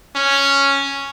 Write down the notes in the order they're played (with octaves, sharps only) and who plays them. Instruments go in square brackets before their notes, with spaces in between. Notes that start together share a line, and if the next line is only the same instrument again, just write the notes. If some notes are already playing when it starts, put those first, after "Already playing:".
[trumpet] C#4